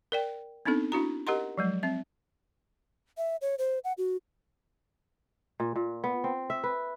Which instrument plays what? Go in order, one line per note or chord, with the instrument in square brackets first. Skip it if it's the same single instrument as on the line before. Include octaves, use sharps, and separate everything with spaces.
[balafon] A#4 D5 G5
B3 C4 D4 D#4 A4
D4 E4 F#4 A#5
G4 A#4 D#5 F#5 A#5 C6
F3 F#3 G#3
C4 E5
[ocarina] E5
C#5
C5
F#5
F#4
[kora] A#2
A#2
B3
C4
E5
B4